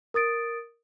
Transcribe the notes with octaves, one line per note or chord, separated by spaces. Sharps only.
A#4 D#6 A6 D7